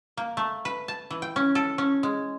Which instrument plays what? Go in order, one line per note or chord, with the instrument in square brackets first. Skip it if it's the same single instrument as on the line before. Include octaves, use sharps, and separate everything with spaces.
[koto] A#3
A3
B4
A5
E3
G5
C#4
A4
C#4
G#3